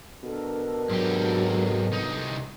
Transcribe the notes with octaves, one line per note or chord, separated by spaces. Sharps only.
B2 D4 A4 A#4
G#2 F#3 G4
C2 D#4